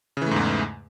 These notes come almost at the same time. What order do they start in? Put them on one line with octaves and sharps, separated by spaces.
C#3 E3 A3 G#2 E2